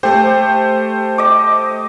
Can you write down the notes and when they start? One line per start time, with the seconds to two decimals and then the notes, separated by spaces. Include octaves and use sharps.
0.03 A3 G4 C5
1.18 D#5 D6